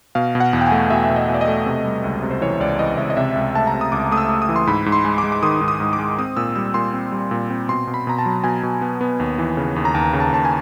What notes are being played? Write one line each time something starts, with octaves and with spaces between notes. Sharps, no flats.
B2 F5
B2
F#5
E2
G5
G#5
A3
B2 E5
B2
D#5
B2
D5
D#5
A3
C3
G3
C#2
C3
C5
E3 C#5
C#2 D5
E3 D#5
C#2 E5
D#5
C3 E5
C#2
E5
A3 A5
A#5
C3
D#6
C#2 D6
A3 D#6
E6
A3
D#6
E3
C6
G#2 B5
G#2
C6
G#3
D6
G#3
D6
D#3 D#6
G#2
D#6
G#2
D6
G#3
C4 D#6
A#2 E6
G3 E6
A#2 C6
C4
G3
A#2
C4
B2 C6
B2
B5
B2 A#5
A5
F#3
B2 G#5
B2
B3
B3
D#2
E3
C#3
D#2
A#5
D#2 A5
C#3
A5
D#2 A5
G#5